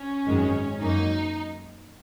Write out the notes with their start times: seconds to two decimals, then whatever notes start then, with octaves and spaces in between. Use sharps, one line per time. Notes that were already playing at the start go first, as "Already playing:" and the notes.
Already playing: C#4
0.26 G#1 F#2 D#3 G#3
0.80 F#2 F#3 A#3 D#4